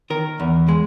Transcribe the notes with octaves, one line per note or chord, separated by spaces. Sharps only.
D#3 A#4
E2
G#3